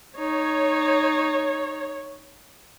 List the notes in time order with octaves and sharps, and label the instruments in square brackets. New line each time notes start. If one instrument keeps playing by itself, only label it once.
[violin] D#4 [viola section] C#5